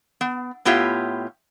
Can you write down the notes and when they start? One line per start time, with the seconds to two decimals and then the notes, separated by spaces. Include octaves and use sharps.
0.21 B3
0.65 A2 B3 F4 G4 C#5 E5